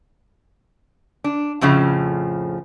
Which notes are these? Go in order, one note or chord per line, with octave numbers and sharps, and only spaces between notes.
D4
F2 A2 C#3 F3